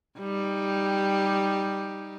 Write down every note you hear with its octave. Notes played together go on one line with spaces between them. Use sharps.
G3 D#4 G4